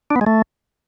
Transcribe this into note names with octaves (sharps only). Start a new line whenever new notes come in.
D4
B3
G#3
A3